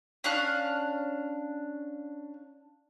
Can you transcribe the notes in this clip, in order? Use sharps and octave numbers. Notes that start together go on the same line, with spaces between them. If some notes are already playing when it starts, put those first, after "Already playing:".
C#4 D4 F5 F#6